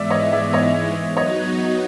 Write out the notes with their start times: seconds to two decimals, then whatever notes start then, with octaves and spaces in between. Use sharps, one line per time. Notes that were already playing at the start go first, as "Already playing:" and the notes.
Already playing: G#2 E3 G#3 B3 D5 E5
0.10 C#5 D#5
0.32 D5 E5
0.53 C#5 D#5
1.17 F#3 B3 D#4 F#4 C#5 D#5